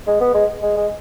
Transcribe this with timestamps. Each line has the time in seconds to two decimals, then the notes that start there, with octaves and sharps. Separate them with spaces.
0.07 G#3
0.20 B3
0.34 G#3
0.62 G#3
0.77 G#3